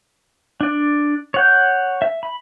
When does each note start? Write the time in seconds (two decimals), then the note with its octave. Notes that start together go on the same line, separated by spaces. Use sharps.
0.61 D4 D5
1.34 C#5 F#5 G6
2.02 E5
2.23 B5